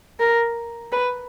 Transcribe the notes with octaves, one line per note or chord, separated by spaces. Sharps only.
A#4
B4